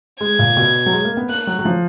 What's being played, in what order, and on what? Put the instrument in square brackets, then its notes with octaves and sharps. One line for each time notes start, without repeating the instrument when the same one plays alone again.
[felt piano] G#3 [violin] G#6
[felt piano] A#2
B2
F#3
G#3
A#3
B3
[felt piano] A#3 [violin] F#6
[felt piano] F#3
F#3
F3